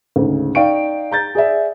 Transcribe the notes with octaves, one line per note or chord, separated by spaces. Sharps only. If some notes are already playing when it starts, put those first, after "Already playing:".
D2 G#2 C#3
D#4 D5 F5 G5 C#6 D7
A#5 G6 A6
G#4 D5 E5